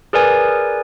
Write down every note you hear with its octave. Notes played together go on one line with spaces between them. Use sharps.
G#4 A#4 B4 D5 G#5